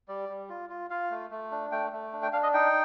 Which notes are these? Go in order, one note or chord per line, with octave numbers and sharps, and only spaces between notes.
G3 D5
G3
F4
F4
F4 F5
A3
A3
D4
A3 G5
A3
D4
G5
D4 F5
D#5
D#4 G5